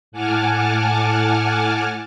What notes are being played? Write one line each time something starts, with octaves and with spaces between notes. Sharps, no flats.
A2 F#5 G#5 A5 D6 F6